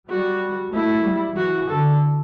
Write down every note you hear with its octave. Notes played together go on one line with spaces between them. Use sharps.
G3 F#4
A3 E4
G3
E3 F#4
D3 A4